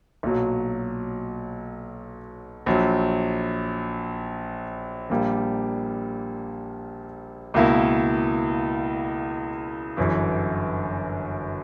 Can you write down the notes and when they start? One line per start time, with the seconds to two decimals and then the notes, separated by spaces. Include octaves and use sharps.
0.23 B1 A#2 F#3
2.66 A#1 A#2 F#3
5.10 A#1 A#2 G3 A#3
7.54 C#2 B2 A#3 E4
9.97 G1 F#2 E3